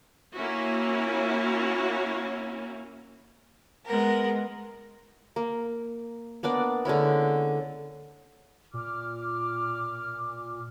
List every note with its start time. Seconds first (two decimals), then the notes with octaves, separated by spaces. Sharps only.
0.34 A#3 C#4 E4 F#4
3.86 G#3 B3 A#4
5.36 A#3
6.43 A#3 B3 D4 D5
6.85 D3 G#3 C#4 E4
8.74 A#2 D6 F6